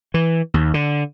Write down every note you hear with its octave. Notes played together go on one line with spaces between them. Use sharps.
E3
D#2
D3